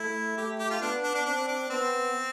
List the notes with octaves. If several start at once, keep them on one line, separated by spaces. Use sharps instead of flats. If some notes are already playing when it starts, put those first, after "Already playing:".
Already playing: A3 E4
A3 G4
G4
F4
B3 D4
D4
D4
C4 D4
D4
B3 C4